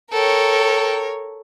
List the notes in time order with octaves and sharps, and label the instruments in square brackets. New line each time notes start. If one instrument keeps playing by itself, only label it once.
[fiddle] A4 G5 [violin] A#4 C#5